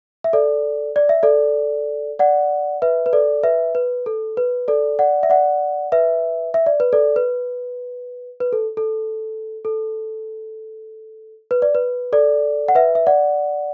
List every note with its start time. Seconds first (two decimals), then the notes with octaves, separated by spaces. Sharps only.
0.24 E5
0.33 A4 D5
0.96 D5
1.09 E5
1.23 A4 D5
2.19 D5 F#5
2.82 B4 E5
3.06 B4
3.13 A4 D5
3.43 B4 E5
3.75 B4
4.06 A4
4.37 B4
4.68 A4 D5
4.99 D5 F#5
5.23 E5
5.30 D5 F#5
5.92 B4 E5
6.54 E5
6.66 D5
6.80 B4
6.93 A4 D5
7.16 B4
8.40 B4
8.53 A4
8.77 A4
9.65 A4
11.51 B4
11.62 D5
11.75 B4
12.13 A4 D5
12.68 F#5
12.75 B4 E5
12.95 E5
13.07 D5 F#5